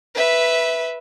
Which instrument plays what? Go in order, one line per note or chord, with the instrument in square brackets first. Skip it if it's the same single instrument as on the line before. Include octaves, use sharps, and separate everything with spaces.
[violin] B4 E5